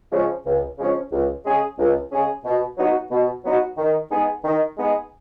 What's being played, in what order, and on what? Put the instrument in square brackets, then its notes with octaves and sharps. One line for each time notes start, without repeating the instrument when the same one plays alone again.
[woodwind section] C#3 F3 G#3 C#4
C#2
C#3 F3 G#3 C#4
C#2
C#3 G#3 C#4 G#4
C#2
C#3 G#3 C#4 G#4
B2
F#3 B3 D#4 F#4
B2
F#3 B3 D#4 F#4
D#3
G#3 B3 D#4 G#4
D#3
G#3 B3 D#4 G#4